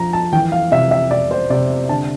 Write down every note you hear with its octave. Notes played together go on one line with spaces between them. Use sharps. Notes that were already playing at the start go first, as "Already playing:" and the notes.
Already playing: F3 A#5
A5
E3 G5
F5
C3 E5
E5
C3 D5
C5
C3 D5
D3 A5